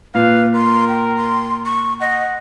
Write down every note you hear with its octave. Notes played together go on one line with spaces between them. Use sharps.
A#2 B4 F5
A#4 C6
G5
C6
C#6
D#5 F#5